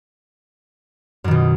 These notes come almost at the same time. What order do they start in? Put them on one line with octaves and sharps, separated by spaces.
F#2 D#3 B2